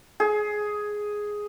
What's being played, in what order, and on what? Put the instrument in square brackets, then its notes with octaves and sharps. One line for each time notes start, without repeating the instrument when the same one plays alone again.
[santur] G#4